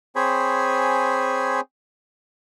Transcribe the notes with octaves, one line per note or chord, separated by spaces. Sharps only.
C4 G#4 C5 C#5 G#5 B5